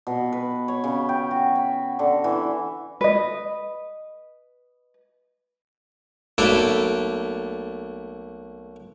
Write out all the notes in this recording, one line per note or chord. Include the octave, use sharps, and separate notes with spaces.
B2
B4
C#5
C#3
G5
F#4
B5
D3
E3
B4 D#5
B1 A3 A#3 D4 A4 E5